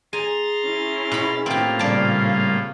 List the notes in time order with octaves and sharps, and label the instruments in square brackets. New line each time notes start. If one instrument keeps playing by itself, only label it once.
[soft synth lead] G#4 [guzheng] G#5 [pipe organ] A#5 C6 A6
[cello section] C#4 E4
[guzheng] B2 B5
[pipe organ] A2 A#3 F4 [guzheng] C4 G4
[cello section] A#2 C#3 F5 [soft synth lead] G3 [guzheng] D5 A5